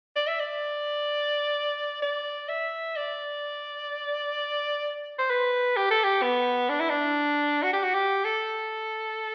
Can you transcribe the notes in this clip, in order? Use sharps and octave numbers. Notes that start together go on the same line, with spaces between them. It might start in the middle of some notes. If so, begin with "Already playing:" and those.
D5
E5
D5
D5
E5
D5
C5
B4
G4
A4
G4
B3
D4
E4
D4
F#4
G4
F#4
G4
A4